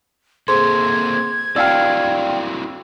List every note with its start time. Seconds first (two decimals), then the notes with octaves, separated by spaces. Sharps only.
0.48 A#3 C4 G#4 A4 C5 C6 G#6
1.56 C4 E4 F#4 D5 F5 G5 E6 F6